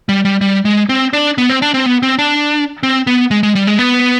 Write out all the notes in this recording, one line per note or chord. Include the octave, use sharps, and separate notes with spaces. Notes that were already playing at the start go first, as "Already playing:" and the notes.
G3
G3
G3
G#3
C4
D4
B3
C4
D4
C4
B3
C4
D4
C4
B3
G#3
G#3
G3
G#3
B3